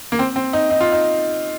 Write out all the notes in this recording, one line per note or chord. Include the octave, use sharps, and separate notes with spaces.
A#3
C4
C4
D#4
D#4
F4
D#4